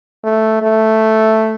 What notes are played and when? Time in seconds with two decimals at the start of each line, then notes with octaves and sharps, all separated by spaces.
0.24 A3
0.62 A3